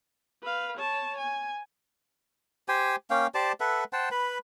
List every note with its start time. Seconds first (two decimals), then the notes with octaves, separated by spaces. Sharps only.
0.43 B4 F5
0.77 C#5 A5
1.18 G#5
2.68 G4 C5 G5 G#5
3.10 A#3 C#4 F5 G5
3.34 G4 C5 D5 A5
3.60 A4 B4 E5 F#5
3.93 C5 F#5 G5 A5
4.11 B4 B5